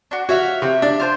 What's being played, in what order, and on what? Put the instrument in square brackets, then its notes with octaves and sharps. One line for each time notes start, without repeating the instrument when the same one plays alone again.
[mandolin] D4 F#4
[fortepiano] F#4 [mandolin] C#5 E5 F5
[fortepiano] C3
D4
[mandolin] F4 C5 A5